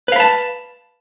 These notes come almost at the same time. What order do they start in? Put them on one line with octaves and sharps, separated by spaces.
B4 F5 B5 A5